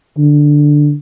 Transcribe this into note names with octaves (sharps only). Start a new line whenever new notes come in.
D3